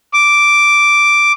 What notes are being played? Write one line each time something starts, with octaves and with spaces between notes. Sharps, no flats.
D6